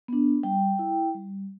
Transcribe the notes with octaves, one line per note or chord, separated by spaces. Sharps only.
B3 D4
G3 G5
E4
G3